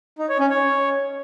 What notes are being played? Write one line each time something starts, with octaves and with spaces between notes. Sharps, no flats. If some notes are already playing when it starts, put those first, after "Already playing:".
D#4
C#5
C#4
C#5